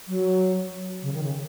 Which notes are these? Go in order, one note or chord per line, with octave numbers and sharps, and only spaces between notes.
F#3
C#3
D#3
C#3